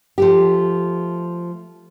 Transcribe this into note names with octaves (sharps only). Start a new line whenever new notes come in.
F3 A3 G4